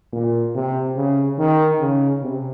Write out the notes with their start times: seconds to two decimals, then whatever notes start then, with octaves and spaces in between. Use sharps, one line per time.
0.13 A#2
0.55 C3
0.96 C#3
1.38 D#3
1.80 C#3
2.22 C3